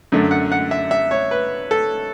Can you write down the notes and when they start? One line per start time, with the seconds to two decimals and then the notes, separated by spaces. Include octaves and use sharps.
0.12 F#2 D3 A3
0.31 F#5
0.52 F#5
0.71 E5
0.91 E5
1.11 C#5
1.31 B4
1.71 A4